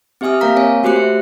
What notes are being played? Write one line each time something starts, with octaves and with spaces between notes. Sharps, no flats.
C4 G4 E5 G#5 D#6 F6
A#3 A#4 F5 A#5 B6
C4 C#5 G#5
A3 F#4 G4 C5 F#6 C#7
E5